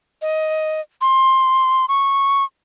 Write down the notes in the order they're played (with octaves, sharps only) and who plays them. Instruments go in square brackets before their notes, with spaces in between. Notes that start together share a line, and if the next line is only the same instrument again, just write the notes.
[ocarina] D#5
C6
C#6